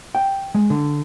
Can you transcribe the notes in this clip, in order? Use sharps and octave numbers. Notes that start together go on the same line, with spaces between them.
G5
G#3
D3